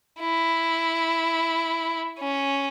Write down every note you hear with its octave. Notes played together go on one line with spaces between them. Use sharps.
E4
C#4